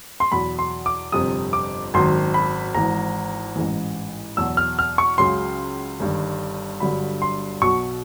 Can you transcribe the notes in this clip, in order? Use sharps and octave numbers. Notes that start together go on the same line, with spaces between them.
C6
E2 B2 F#3 B5
C6
D6
G1 F2 C3 D#6
D6
G#1 F#2 D#3 F#3 C6
B5
G#1 G#2 E3 A#5
A1 G#2 E3
E2 B2 F#3 E6
F6
F6
C#6
C#2 C#3 F#3 C6
G1 G2 D#3
G1 G2 D3 F#3 B5
C6
B1 B2 F#3 C#6